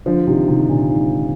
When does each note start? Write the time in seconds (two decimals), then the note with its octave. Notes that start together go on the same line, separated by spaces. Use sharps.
0.06 D3 F3
0.27 C3 D#3
0.47 C3 D#3
0.68 A#2 D3
0.90 G#2